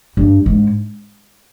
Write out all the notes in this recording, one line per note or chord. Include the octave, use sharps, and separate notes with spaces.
G2
G#2